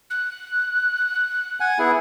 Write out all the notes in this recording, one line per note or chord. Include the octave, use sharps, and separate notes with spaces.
F#6
F#5 G#5
B3 E4 G#4